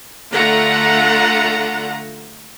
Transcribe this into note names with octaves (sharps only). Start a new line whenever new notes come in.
D3 A3 F4 F#5 A#5